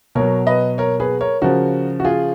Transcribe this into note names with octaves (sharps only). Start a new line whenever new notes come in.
B2 F#3 A#4 C#5
B4 D#5
A#4 C#5
G#4 B4
A#4 C#5
C#3 F3 F#4 A#4
F#4
F4 G#4